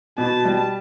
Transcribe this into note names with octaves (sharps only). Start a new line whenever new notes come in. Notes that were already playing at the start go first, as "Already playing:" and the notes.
B2 A5
G3